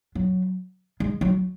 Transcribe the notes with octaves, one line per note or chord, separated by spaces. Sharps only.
F#3
G#3
F#3